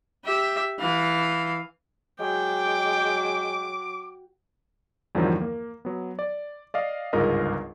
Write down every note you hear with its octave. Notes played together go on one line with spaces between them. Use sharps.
G4 E5
E3 F5
F#3 G#3 G5 D6
E2 G2 D3 D#3 F3 F#3
A#3
F#3 B3
D5
D5 D#5 F5
G1 C#2 G#2 F4 A#4 D#5